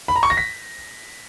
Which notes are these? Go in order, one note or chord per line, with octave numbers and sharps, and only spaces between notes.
B5
A#5
C#6
A#6
B6